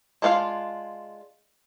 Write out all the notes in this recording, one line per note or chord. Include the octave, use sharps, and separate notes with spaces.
G#3 D4 F4 B4 F5